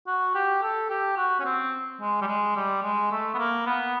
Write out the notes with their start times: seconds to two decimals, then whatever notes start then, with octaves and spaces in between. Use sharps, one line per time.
0.07 F#4
0.34 G4
0.62 A4
0.90 G4
1.17 F#4
1.40 C#4
1.45 C4
2.01 G#3
2.21 G3
2.27 G#3
2.56 G3
2.82 G#3
3.11 A3
3.34 B3
3.38 A#3
3.66 B3